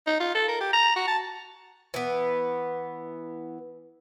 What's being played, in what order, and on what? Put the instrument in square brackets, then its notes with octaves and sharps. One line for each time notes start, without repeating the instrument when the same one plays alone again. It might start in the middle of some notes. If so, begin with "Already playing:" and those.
[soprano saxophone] D#4
F4
A4
A#4
G4
A#5
F#4
A5
[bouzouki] E3 B3